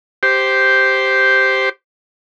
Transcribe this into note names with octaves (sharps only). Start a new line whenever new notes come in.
G4 C5